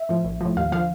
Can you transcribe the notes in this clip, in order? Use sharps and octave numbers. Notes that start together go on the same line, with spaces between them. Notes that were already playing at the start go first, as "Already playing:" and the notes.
Already playing: E5
A2 F3
A#1
A2 F3
D#2 F5
D3 F3 F5